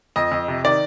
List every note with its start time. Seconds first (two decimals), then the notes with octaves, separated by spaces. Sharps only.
0.16 F2 D#5
0.32 F2
0.48 C3
0.64 D#3 D5